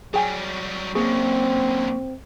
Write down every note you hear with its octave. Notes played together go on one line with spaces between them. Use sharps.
F#3 G3 G#4 G5 G#5
F#2 D3 A#3 C4 G#4 C#6